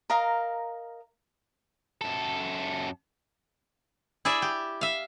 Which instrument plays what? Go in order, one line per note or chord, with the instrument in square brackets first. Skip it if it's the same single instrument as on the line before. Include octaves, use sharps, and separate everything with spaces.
[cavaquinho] A#4 D#5 F5 A#5
[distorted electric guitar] F#2 A4
[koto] E4 G#4 D5 E5
G4
E5 F5